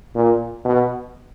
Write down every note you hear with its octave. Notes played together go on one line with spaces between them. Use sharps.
A#2
B2